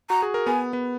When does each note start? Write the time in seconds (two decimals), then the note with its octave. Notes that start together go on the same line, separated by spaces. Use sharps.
0.10 F#4 A#5
0.22 G#4
0.34 A#4
0.47 B3 G#5
0.73 B3